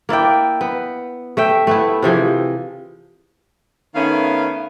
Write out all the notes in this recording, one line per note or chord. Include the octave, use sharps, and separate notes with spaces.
A#3 E4 D5 G5
B3
A3 E5 G5
A3 B3 E4
C3 E3 F3 G#4
D#3 A3 B3 C#4 F5